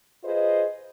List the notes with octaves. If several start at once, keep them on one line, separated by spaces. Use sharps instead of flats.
F4 G#4 B4 C5 D#5